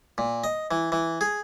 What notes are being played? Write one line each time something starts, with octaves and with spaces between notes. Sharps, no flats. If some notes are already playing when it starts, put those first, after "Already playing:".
A#2
D#5
E3
E3
G#4